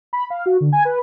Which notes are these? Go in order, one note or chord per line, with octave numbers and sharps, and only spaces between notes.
B5
F5
F#4
D3
G#5
B4